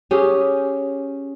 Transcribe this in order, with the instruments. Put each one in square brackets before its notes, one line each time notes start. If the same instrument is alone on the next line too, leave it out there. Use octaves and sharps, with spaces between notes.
[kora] C#4 G4 G#4